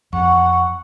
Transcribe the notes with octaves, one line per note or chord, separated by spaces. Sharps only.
F2 F#5 C#6